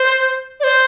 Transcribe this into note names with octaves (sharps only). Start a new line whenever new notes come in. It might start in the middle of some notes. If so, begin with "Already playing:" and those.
Already playing: C5
D5
C5